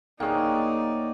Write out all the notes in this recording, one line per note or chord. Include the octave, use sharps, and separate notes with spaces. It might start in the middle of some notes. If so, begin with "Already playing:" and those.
D1 A#3 D#4 G#4 C#5 D5 F#5 G5